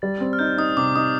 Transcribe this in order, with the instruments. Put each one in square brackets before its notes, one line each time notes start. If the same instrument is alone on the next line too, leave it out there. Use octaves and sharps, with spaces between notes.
[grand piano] G3 [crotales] A6
[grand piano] C4
[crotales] F6
[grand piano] D#4 [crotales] G6
[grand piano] D#4 [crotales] D#6
[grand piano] C3 [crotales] D6
[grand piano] D#4 [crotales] D#6